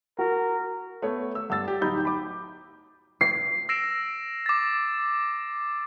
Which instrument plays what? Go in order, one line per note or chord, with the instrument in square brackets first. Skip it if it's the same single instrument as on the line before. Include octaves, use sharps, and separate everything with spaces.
[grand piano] F#4 [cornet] A#4
[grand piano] A3 B3 C#5
E6
G2 F#5 E6 A6
G4
D1 D#4 G4 B5 G6
B5 D6
[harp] C7
[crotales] E6 A#6 C7 D7 E7
D6 A6